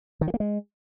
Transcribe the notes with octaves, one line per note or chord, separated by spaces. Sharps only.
D#3
F3
A#3
G#3